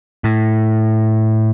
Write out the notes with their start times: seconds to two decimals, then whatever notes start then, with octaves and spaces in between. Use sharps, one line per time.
0.24 A2